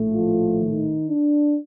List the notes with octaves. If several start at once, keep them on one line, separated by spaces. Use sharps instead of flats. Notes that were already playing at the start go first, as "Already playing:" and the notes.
Already playing: A#1 A2 A3
F3 F4
D#3 D#4
D4